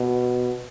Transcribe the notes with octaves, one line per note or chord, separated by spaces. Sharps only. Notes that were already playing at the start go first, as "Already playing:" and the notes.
Already playing: B2